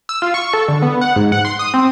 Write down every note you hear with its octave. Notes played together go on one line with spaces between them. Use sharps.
E6
F4
C#6
A4
D3
B3
F#5
G#2
F#5
C6
D#6
C4